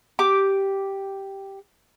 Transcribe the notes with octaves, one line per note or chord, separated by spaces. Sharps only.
G4 D6